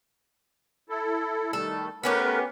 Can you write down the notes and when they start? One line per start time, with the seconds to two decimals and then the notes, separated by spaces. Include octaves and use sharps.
0.89 E4 A4
1.53 D#3 G3 A3 A4
2.03 A3 B3 C#4 G4 A#4 B4